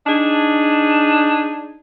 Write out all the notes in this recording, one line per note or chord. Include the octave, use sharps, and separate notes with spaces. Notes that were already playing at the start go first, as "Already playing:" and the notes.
D4 D#4 G#4